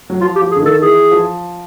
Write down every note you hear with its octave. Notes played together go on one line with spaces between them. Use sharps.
F#3
F3 F4
G4
F3
G#4
D3
D#3 A4
E3 G#4
F3